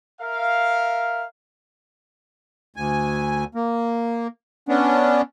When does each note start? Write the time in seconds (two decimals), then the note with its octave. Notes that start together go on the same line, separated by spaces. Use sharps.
0.21 A#4 E5 F5
2.76 D2 G#5
3.55 A#3
4.69 B3 C#4 D4